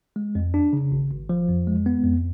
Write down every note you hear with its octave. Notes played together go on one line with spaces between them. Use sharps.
G#3
F2
D4
C#3
G#1
G#1
F3
F2
G#3
B3
F2